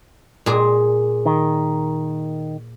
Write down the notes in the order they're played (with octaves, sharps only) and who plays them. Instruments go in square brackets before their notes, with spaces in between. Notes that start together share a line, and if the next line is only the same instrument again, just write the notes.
[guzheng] A#2 G#4
[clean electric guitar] D#3